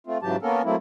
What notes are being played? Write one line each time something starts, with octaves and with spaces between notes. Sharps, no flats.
A3 C4 F4
G#2 C#3 E3 F#3 G4 A5
A#3 B3 C#4 A4 A#4
F#3 A3 A#3 C4 E4